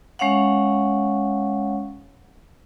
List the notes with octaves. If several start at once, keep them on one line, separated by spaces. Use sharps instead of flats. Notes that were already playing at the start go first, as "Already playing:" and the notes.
G#3 C#4 C#5 F5 F#5